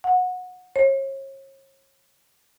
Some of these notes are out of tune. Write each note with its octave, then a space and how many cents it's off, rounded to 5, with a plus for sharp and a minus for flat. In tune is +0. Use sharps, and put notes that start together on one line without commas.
F#5 -20
C#5 -40